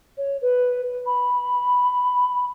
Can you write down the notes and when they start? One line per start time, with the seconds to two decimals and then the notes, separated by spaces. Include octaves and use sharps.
0.18 C#5
0.42 B4
1.06 B5